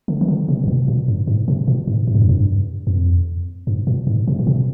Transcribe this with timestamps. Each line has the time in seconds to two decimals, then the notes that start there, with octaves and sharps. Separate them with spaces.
0.08 D3
0.21 D#3
0.28 D3
0.48 C3
0.64 G#2
0.68 A#2
0.88 A#2
1.08 G2
1.27 G#2
1.48 C3
1.68 A#2
1.88 G#2
2.07 G#2
2.15 G2
2.22 F2
2.29 G2
2.87 F2
3.67 G2
3.87 A#2
4.07 G#2
4.28 C3
4.39 A#2
4.47 C3